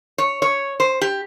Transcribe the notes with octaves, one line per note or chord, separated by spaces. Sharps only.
C#5
C#5
C5
G4